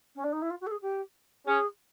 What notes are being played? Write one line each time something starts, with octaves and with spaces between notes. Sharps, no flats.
C#4
D4
D#4
E4
F4
F#4
A4
G#4
G4
C#4 G#4